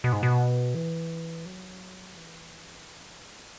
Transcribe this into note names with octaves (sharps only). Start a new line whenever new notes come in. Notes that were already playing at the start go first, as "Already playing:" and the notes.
B2
G#2
B2
E3
F#3
E3